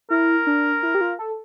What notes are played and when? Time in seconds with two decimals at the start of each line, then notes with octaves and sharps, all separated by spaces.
0.10 E4 A#4
0.47 D4
0.83 E4
0.95 G4
1.01 F4
1.19 A4